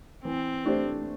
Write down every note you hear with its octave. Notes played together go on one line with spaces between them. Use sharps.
E3 C4
A3 D4 G4 C5